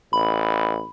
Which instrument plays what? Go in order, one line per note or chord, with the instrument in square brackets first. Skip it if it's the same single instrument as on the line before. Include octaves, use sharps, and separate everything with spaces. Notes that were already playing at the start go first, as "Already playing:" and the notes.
[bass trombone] A1 [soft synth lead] B5